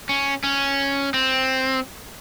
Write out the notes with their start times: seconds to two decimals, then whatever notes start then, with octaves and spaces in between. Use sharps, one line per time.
0.09 C#4
0.44 C#4
1.14 C4